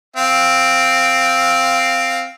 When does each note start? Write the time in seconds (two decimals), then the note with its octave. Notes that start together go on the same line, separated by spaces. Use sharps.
0.17 C4 F5